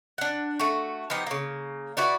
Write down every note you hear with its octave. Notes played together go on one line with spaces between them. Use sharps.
D4 F#5
A3 F#4
F3 B3 D#4 G4
C#3 A#3
E4 F#4 B4 D5